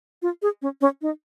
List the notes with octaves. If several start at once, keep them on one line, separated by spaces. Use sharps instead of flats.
F4
G#4
C#4
C#4
D#4